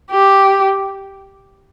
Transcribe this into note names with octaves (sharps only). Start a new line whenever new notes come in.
G4